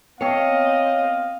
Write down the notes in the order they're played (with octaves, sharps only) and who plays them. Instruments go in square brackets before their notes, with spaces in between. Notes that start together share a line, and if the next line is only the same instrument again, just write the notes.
[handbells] B3 G5 C#7 [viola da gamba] C4 D#5 [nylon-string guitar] A4 C#5 [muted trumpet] F5